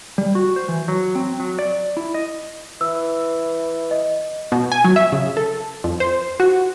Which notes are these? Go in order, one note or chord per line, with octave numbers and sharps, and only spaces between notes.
G3
F#4
C5
E3
F#3
C4
F#3
D5
E4
D#5
E3 E6
D#5
B2
G#5
F#3
E5
C#3
A4
F2
C5
F#4